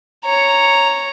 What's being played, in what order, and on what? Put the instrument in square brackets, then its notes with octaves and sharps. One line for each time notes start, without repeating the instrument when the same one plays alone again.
[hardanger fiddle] C#5 A#5